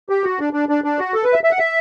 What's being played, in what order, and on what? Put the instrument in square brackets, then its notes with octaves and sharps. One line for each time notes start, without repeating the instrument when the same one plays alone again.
[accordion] G4
F#4
D4
D4
D4
D4
F#4
A4
B4
E5
E5
F#5
E5